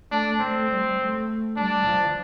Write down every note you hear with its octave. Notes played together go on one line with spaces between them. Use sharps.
A3 D4
A3 C4
G3
A3
G3 D4
F3